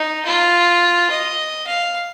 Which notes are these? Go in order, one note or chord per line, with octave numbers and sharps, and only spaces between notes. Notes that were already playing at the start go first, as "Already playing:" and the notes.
Already playing: D#4
F4
D#5
F5